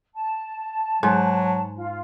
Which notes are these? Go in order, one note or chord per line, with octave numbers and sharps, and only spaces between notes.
A5
G#2 F#3
F4